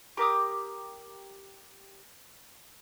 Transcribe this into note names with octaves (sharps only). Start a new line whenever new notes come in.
G4 A#4 D6 D#6